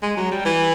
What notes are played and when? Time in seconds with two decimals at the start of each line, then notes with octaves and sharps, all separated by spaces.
0.02 G#3
0.17 F#3
0.32 G3
0.45 E3